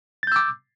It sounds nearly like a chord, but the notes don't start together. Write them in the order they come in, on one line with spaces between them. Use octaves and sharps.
A6 G6 E6 D6